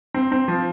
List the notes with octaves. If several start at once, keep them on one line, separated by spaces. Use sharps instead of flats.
C4
C4
F3